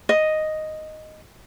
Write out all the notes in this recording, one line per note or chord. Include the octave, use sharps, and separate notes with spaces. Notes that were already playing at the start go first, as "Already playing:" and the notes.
D#5